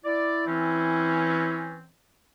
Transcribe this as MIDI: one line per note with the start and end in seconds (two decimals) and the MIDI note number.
0.05 1.76 64
0.05 0.45 74
0.47 1.86 52
0.47 1.86 60
0.47 1.86 61